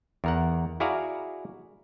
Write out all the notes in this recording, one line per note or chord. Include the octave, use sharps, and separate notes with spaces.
E2 A#4 F#5
E4 F#4 G#4 D5 F5 A#5